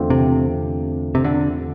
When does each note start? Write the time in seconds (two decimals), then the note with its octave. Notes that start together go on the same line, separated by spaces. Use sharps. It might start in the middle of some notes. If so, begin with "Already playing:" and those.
Already playing: E2 D3 A3 C4 F4
0.10 C3
1.15 C3
1.24 D3